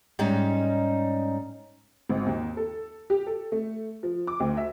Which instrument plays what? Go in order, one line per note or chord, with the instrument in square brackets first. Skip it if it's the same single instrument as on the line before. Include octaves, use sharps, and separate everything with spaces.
[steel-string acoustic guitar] G#2 G3 C#4 D#4
[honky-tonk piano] G#1
D#2
A4
G4
A4
A3
F3
D6
D2
E5